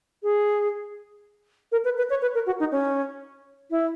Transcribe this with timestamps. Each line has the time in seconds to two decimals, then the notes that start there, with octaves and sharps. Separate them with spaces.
0.23 G#4
1.72 A#4
1.85 B4
1.97 B4
2.10 C#5
2.22 B4
2.34 A#4
2.46 F#4
2.60 D#4
2.72 C#4
3.71 E4